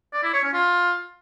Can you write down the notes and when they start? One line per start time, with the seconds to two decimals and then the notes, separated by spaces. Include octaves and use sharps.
0.13 D5
0.23 E4
0.33 C#5
0.43 C#4
0.53 F4